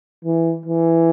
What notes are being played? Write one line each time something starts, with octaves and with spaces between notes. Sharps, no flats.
E3
E3